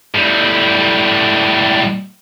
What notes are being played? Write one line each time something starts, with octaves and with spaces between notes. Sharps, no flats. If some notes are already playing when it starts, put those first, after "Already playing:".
A2 G3